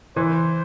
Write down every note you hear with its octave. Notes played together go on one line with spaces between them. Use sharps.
E3 C5